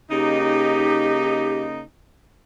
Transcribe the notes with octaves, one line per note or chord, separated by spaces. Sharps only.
C#3 A#3 D#4 G4